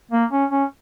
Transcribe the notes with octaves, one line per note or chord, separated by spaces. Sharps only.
A#3
C#4
C#4